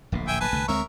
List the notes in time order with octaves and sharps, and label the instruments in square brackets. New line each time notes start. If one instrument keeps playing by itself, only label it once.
[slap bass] D1 A#1 A2
[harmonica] E5 G5 G#5
B4 G#5 A5
[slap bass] C2 D3 A3
[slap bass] D2 G#3 C4 [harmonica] A#4 C#5 E5